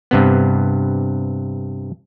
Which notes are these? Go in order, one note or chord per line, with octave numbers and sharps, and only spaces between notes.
G2 C3 B3